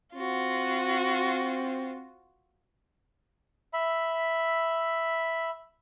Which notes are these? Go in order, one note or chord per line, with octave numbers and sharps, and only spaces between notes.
C4 F4 F#4
E5 B5